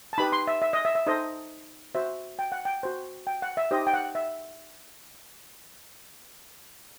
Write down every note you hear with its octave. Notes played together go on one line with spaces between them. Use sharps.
A5
D#4 G4 B4 B5
C6
E5
E5
D#5
E5
E5
D#4 A4 C5 D#5
F#4 C5 E5
G5
F#5
G5
F#4 C5
G5
F#5
E5
D#4 G4 C5 D#5
G5
F#5
E5